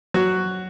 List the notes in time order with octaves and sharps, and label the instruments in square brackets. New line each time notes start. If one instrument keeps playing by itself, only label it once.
[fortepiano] F#3 F#4